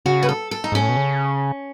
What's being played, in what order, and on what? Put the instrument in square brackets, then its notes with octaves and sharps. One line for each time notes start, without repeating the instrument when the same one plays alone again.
[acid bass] C#3 [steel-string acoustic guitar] F#4
[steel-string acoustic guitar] B4
A4
A4
D#4
[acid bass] G#2 [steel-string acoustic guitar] C#4
[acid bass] A2
B2
C#3